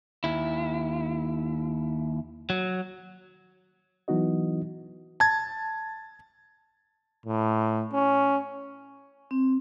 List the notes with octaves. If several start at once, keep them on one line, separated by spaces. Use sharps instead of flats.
D#2 E4
F#3
E3 F#3 B3 D#4 F#4 D#5
A5 G#6
A2
C#4
C4